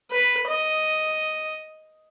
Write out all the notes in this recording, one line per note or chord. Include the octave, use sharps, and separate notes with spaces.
B4
D#5